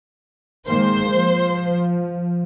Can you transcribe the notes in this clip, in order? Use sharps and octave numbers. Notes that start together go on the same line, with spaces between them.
D#3 G#3 A#3 C5
F3